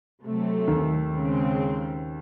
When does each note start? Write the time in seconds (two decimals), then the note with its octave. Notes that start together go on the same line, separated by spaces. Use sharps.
0.23 C3 F#3 A3
0.67 D#2 D#3
1.13 C#3 G#3 C4